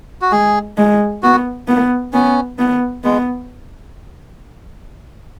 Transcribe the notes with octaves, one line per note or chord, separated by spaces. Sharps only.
F#4
G#3 G#4
G#3
B3 F#4
B3
B3 C#4
B3
G#3 B3